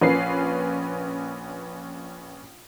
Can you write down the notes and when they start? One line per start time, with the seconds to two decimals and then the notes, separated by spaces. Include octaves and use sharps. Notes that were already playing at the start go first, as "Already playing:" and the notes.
0.01 A#1 C#4 B4 C7